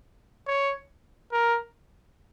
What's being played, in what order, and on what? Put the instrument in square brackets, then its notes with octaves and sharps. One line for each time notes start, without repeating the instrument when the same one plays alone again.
[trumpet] C#5
A#4